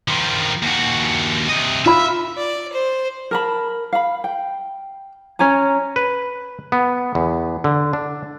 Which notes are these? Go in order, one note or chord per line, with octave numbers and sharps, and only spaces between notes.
D#3 F3
D#2 F#4
C3 D#5
F4 E5 B5
D5
C5
A#4 A5 B5
F5 B5
G5
C#4 C#5 G#5 A#5
B4
B3
E2
D3
D4